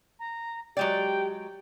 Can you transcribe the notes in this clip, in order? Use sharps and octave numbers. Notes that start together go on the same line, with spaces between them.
A#5
F#3 G#3 G4 D5 G5